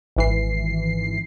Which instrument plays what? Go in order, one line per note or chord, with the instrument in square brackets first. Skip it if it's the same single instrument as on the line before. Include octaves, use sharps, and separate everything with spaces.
[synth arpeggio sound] G#1 E3 C7